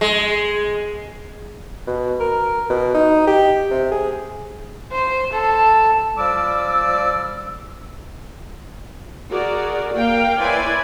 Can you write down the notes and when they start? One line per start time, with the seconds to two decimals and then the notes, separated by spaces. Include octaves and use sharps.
0.01 G#3
1.87 B2
2.20 A#4
2.70 B2
2.94 D#4
3.28 G4
3.71 C3
3.92 G#4
4.92 C5
5.32 A4
6.18 F3 G3 D5 D6 E6
9.31 F#4 G#4 A#4 D5
9.94 A#3 A#4 F5 G5
10.40 E4 B4 C#5 D5 G#5 C6